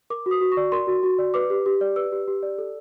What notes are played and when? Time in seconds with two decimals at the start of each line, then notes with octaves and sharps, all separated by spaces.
0.10 A#4 D6
0.26 F#4
0.31 D#6
0.41 F#4
0.52 C#6
0.57 D5
0.72 A#4 C6
0.87 F#4
1.03 F#4
1.19 D5
1.34 B4 D6
1.50 G4
1.66 G4
1.81 D5
1.96 B4 E6
2.12 G4
2.28 G4
2.43 D5
2.58 A4